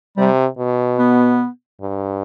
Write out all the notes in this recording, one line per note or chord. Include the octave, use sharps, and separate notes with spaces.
C3 G3
B2
B3
G2